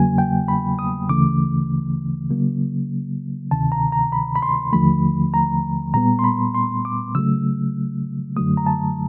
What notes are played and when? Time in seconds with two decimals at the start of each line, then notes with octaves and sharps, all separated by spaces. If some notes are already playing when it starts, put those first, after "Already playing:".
Already playing: E2 C#3 F#3 A#3 G#5
0.18 G5
0.48 B5
0.79 D#6
1.09 D2 C#3 E3 A3 D6
2.30 C#3 F#3 A#3
3.51 D2 C3 D#3 A5
3.72 A#5
3.92 A#5
4.12 B5
4.36 B5
4.42 C6
4.73 D#2 D3 F3 A3 B5
5.34 A#5
5.94 A#2 G3 B3 A#5
6.19 C6
6.24 B5
6.55 C6
6.85 D6
7.15 C#3 F#3 A3 E6
8.36 F#2 D3 F#3 A3 D#6
8.57 A#5
8.66 A5